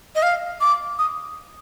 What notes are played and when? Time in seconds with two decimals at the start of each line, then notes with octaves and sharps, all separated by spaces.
0.15 D#5
0.23 F5
0.61 D6
0.99 D#6